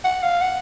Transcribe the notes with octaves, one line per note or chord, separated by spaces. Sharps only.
F#5
F5
F#5